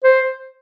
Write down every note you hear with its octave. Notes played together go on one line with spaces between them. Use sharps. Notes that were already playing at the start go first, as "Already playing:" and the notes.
C5